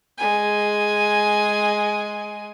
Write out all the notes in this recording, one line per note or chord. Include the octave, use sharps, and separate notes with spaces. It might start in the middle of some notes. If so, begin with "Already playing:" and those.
G#3 G#5